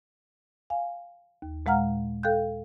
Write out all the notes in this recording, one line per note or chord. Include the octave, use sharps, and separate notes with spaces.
F5 G#5
D#2
A#2 G#3 F5 F#5 A#5 F6
A4 F5 G5 F#6 G6